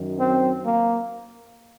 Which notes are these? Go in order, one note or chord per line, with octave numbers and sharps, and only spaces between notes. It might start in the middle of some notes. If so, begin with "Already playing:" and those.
Already playing: F#2 D#3 F#3
C4
A#3